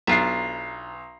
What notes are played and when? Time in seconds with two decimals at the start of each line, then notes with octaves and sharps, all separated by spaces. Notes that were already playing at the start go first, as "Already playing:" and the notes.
0.07 B1 D4 F4 E5 A#5 C7